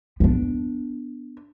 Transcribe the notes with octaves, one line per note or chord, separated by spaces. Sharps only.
B3 D4